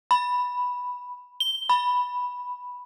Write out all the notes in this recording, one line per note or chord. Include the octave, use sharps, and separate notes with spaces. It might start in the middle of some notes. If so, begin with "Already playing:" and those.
B5
G7
B5